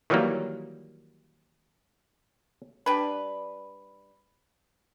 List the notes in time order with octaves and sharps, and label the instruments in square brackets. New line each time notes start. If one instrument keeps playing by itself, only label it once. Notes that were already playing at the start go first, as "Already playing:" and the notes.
[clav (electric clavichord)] D#3 E3 F#3 G3 A#3
[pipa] G3 D4 B4